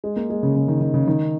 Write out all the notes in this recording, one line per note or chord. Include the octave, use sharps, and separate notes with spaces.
G#3
A#3
G#3
C#3
C#3
D#3
D#3
C#3
D#3